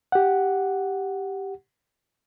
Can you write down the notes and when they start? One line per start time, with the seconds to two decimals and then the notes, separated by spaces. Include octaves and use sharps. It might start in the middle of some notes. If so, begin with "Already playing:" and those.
0.12 G4 F#5